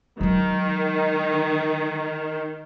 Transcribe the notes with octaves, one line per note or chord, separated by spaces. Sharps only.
D#3 F#3 G#3